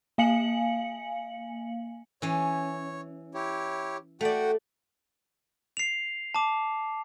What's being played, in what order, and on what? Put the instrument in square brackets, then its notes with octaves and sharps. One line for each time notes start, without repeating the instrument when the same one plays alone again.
[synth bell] A#3 F5 G#5 C#7 F#7
[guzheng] E3 C#4 [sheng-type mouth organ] C#5
[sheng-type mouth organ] E4 G4 C#5
[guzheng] A3 D5 [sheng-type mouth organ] F#4 F#5 G5
[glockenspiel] C7 F7
A5 D6